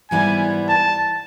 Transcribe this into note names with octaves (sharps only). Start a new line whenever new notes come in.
G#2 E3 G3 B3 E4 G#5
A5